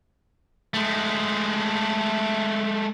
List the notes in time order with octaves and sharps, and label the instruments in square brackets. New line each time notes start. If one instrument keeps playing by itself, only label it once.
[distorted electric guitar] G#3 A3